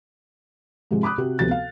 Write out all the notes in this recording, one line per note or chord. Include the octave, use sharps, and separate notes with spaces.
G#2 C3 F3 G#3
B5 D6 D#6 F#6
C3 F#4 G4
D2 C3 F3 B3 A6
F5